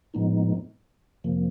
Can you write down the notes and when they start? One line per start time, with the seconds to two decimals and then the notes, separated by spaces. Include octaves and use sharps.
0.14 A2 F3 G#3 B3 D#4
1.24 F2 C3 F3 A#3